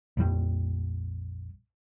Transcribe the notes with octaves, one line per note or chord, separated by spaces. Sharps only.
A#1 F2 G3